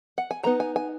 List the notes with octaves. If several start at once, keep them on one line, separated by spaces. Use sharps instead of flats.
F#5
G#5
E3 B3 D#4 A#5
G#5
G#5